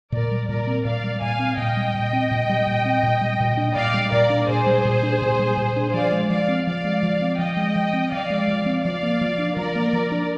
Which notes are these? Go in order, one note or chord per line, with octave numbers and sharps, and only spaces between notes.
A#2 A#4 D5
G3
A#2 A#4 D5
C4
A#2 D5 F5
G3
A#2 F5 G#5
C4
A#2 D#5 G5
G3
A#2
C4
A#2
G3
A#2
C4
A#2
G3
A#2
D4
A#2 D5 F5
G3
A#2 A#4 D5
D4
A#2 G#4 C5
G3
A#2
D4
A#2
G3
A#2
D4
F3 D5 F5
G#3
F3 D5 F5
C4
F3 D5 F5
G#3
F3
C4
F3 D#5 G5
G#3
F3
C4
F3 D5 F5
G#3
F3
C4
F3 D5 F5
A#3
F3
D4
F3 A#4 D5
A#3
F3
D4